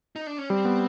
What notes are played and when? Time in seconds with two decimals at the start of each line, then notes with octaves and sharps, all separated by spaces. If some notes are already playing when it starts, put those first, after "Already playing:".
0.16 D#4
0.27 D4
0.38 C#4
0.49 G3 C4
0.65 B3